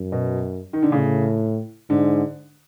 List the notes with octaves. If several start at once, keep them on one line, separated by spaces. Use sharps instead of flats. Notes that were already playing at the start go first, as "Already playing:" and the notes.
Already playing: F#2
B2
D#3
D3
A2 C#3
G#2 D3